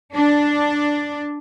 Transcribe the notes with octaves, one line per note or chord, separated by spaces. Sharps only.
D4